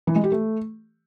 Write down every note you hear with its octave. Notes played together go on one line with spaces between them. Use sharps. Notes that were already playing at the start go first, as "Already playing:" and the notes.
E3
G#3
G4
A3